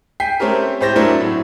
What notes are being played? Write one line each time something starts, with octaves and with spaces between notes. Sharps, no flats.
G5 G#5 B6 C7
A3 C4 C#4 G4 A#4
A2 G4 C5 A6 A#6
F#3 A3 C4 D4 E4 A#4
A2 F#3